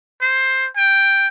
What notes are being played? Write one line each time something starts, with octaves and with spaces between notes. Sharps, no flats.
C5
G5